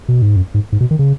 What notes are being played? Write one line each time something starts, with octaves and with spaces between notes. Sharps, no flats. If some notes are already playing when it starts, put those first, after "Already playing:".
B2
G#2
F#2
G#2
G#2
B2
D#3
C#3